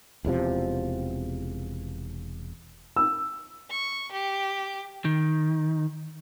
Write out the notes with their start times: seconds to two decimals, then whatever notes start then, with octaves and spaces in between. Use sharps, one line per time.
0.25 E1 E2 C3 F3
2.96 E6
3.70 C#6
4.12 G4
5.05 D#3